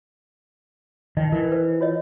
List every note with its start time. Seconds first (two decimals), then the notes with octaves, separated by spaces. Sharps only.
1.17 D#3 D#4 D#5
1.32 E3 A#4
1.52 B4 C5
1.81 F4 C#5 D#5